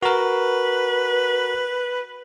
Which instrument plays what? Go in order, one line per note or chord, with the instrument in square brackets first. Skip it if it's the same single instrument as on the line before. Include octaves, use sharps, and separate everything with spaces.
[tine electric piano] F#4 A#4 [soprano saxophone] B4